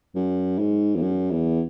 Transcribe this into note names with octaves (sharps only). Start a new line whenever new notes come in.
F#2
G#2
E2
F#2
E2